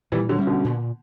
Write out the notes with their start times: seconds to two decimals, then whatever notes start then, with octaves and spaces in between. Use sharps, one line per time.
0.12 A#2 E3 G3
0.29 D3 F#3
0.38 G3 C#4
0.47 B2 D3
0.64 A#2